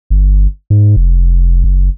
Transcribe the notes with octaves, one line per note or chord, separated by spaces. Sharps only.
G1
G#2
F1
F#1